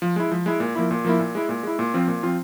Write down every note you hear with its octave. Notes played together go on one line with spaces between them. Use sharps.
F3
G#3 E4
F3
G#3 E4
A#2
F3 A#3 E4
A#2
F3 A#3 E4
A#2
G#3 E4
A#2
G#3 E4
A#2
F3 C4 F4
A#2
F3 C4 F4